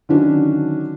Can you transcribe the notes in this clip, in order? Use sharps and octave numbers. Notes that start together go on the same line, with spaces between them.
D3 D#3 F#3 C#4 D4